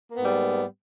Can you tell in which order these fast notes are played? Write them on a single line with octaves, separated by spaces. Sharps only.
A#3 B3 G#2 G3